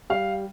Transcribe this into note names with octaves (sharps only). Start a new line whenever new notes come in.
G3 F5